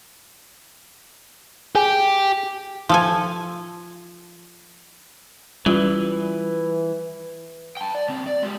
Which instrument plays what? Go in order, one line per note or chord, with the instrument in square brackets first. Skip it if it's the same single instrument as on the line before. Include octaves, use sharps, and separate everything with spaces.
[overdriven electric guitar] G4 [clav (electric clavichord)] G#4
[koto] F3 A4 G#5
[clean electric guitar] E3 [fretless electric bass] G3 [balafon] C#4 F4 [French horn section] B4
[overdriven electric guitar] G5 A5
D5
C#2 C4
D5
G#3 G4